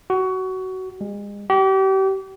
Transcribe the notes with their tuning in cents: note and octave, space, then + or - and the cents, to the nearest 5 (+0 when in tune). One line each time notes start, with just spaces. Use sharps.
F#4 +20
G#3 -35
G4 -35